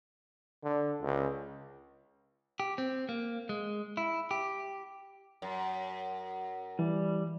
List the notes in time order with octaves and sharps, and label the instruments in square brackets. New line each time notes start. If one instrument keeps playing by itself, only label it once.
[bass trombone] D3
C#2
[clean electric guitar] G4
C4
A#3
G#3
E4
G4
[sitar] F#2
[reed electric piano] E3 [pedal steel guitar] G3